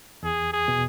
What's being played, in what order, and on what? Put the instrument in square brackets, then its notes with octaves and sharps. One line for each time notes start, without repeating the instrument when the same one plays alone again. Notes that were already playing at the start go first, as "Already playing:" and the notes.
[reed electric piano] E2 [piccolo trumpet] G#4
[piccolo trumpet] G#4
[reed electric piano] B2